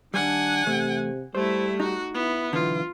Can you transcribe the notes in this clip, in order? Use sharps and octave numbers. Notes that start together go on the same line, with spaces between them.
D#2 G3 D4 F#5 G#5
E2 C3 A3
G3 A3 E4 C5
D#4 F#4
B3 E4
B1 D3 E3 F4